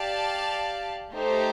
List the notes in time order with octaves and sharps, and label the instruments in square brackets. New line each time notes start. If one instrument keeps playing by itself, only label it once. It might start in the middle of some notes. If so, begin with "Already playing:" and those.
Already playing: [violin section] G4 D5 F5 A5
A3 D#4 G4 C5